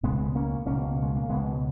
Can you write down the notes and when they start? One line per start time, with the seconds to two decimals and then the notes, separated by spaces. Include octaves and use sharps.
0.03 C#2 B2 G#3 B3
0.35 A#3 C#4
0.66 C#2 B2 A#3 C#4
1.03 G#3
1.16 A#3
1.29 C#2 B2 G#3 B3